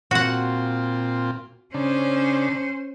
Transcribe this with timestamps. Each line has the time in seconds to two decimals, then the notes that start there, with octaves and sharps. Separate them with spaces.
0.11 A#2 C4 F4 F#4 F#5
1.74 C#3 C#4 D4 C5